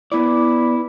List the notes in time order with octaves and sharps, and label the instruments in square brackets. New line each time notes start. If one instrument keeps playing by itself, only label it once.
[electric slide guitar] B3 D5 [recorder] E4